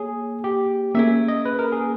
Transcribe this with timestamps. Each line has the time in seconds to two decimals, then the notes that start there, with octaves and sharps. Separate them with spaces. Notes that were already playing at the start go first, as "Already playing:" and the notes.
Already playing: A#3 G#4 C#5
0.44 G4
0.95 A#3 C#4 G#4 E5
1.28 D#5
1.45 B4
1.59 A#4
1.72 G#4